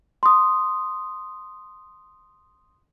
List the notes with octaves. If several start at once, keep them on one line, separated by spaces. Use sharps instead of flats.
C6 D#6